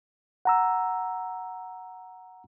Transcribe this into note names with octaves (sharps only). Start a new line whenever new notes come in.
F#5 A#5 E6